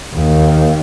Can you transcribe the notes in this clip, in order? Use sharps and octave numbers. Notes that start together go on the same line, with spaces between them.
D#2